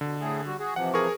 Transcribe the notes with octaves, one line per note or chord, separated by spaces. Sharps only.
B2 D3
A2 A3 G#4
G3 F#4
F#4 G#4
C3 E3 F3 F#5
G#4 A#4 C#6